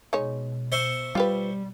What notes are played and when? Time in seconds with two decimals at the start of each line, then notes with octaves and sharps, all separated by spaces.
0.13 B2 G#3 D#4 C#5
0.72 C5 E5 C#6
1.15 G3 F4 G4 B4